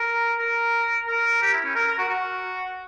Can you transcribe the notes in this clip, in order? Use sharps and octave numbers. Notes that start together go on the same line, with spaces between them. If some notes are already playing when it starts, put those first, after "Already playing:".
Already playing: A#4
A#4
A#4
G4
E4
C#4
A#4
A#4
F#4
F#4